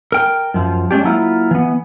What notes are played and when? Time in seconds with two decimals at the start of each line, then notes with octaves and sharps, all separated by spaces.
0.12 A#4 G5
0.54 F#2 F3
0.91 G#3 C#4 D4 G4
1.04 F#3 A#3 E4 F4
1.51 E3 B3